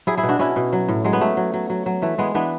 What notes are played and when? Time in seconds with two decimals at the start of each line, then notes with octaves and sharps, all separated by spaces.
0.07 F#3 E4 G#4
0.17 E4 G#4
0.23 B2
0.29 D4 F#4
0.39 B2 C#4 E4
0.56 B2
0.73 F#3
0.88 A2
1.04 F#3 G#3
1.13 B3
1.21 F#3 A3
1.37 F#3
1.54 F#3
1.70 F#3
1.86 F#3
2.02 E3 A3
2.18 E3 G#3 B3
2.35 E3 B3 D4